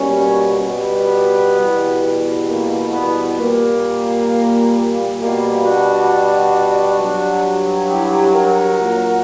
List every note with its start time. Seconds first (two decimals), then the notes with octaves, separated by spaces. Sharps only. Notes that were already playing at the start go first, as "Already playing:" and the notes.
Already playing: B2 G3 A#3 C#4
0.67 G3 B3
1.58 E2 B2 G3
2.48 A#3
2.93 G3 B3
3.38 A#2 G3 A#3
5.19 B2 G3 A#3
5.64 D4 F#4
6.99 G2 F#3
7.89 E4 G4
8.34 F#4 A#4
8.79 A#2 F#3